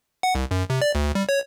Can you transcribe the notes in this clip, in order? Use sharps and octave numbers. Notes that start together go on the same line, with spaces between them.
F#5
C2
F#2
C3
D5
D2
G3
C#5